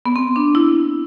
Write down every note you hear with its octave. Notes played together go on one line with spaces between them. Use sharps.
B3
C4
D4
E4